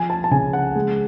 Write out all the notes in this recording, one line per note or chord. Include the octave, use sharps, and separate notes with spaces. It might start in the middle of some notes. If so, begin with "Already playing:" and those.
Already playing: F3 G#5
A5
A5
C#3 G#5
F#5
G#3